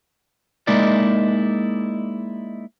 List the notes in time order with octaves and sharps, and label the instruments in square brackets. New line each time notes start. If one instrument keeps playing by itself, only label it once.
[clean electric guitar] G#3 A#3 D#4 E4 D5